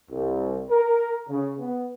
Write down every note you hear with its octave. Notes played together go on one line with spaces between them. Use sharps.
C2
A#4
C#3
B3